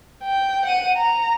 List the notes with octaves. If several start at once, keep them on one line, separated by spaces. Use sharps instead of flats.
G5
F#5 D#7
A#5